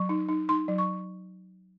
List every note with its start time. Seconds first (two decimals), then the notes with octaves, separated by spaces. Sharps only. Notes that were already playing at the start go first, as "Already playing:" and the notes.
Already playing: F#3 C#6
0.09 D#4
0.28 D#4
0.49 D#4 C6
0.68 F#3
0.78 C#6